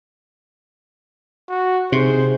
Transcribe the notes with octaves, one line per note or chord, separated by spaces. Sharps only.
F#4
C3 C4 D#4 G#4 C5